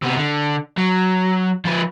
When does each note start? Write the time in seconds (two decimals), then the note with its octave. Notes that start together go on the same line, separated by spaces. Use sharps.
0.02 C3 B3
0.17 D3
0.78 F#3
1.65 F3 B4